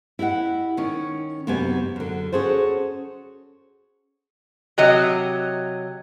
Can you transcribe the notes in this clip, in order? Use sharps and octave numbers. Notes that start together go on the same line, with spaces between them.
E4 G4 D#5 F#5
D#3 C#4
F#2 C3 B3 D#4 G4 G#5
F#2 D3
C#4 F#4 G#4 A4 C5
C3 F#3 D#5